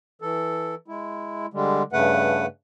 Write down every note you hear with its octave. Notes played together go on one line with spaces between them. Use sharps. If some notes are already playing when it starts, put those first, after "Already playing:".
E3 A4
G#3 E4
D3 G3 G#3
G2 C#3 A3 B4 F#5